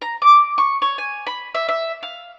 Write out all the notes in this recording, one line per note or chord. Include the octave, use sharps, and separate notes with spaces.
A#5
D6
C#6
C#5
G#5
B5
E5
E5
F5